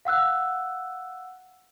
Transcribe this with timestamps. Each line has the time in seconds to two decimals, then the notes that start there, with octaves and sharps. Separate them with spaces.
0.05 F5 F#5 E6 F#6